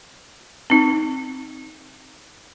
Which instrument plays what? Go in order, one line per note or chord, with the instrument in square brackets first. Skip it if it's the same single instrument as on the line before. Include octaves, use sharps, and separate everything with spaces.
[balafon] C4 D#4